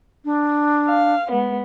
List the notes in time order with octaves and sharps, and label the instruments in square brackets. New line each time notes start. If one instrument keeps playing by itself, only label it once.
[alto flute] D4
[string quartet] F5
G#3 B3